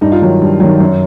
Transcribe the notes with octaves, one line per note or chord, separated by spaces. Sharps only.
G2 D#4
D#4 F4
D#3 F#3
G2
D#3 F#3
F#2